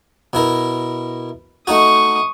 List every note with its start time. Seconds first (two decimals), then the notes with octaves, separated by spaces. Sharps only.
0.33 B2 E4 A#4
1.67 A3 D#4 F#4 C#6 D#6